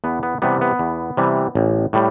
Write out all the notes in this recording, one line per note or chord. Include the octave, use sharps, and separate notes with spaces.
E2 B3
B3
C3 E3 G3 B3
B3
E2
C3 E3 G3
A1
A2 G3